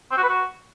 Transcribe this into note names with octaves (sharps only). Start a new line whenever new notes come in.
C4
F#4
B4
F#4